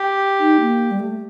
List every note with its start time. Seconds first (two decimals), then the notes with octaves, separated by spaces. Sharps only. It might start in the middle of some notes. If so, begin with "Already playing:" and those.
Already playing: G4
0.40 D#4
0.60 A#3
0.91 G3
1.00 A3